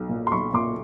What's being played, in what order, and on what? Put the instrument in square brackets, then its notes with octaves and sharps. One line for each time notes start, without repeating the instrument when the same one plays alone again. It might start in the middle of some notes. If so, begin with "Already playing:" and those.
Already playing: [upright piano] B1
A#2
[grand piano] C6
[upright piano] B1 [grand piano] B5 C#6
[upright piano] A#2 [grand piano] C6 D6